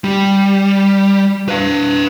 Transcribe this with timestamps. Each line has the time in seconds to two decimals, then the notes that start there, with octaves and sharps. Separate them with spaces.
0.04 G3
1.49 B4 F5